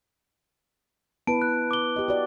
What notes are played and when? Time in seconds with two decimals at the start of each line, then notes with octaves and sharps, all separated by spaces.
1.27 B3 E4 B4 A5 D7
1.42 F#6
1.71 D6 G7
1.96 G4 D#5
2.08 F#4 D5